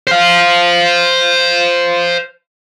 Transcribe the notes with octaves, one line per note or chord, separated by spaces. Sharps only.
C5 F5